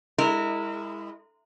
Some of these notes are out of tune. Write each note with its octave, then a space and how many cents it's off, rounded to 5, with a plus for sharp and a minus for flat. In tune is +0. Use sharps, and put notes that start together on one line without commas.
G#3 -25 E4 -10 A#4 -30